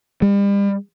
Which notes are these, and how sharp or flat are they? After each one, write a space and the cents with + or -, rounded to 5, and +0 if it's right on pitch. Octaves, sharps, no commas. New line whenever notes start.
G3 +40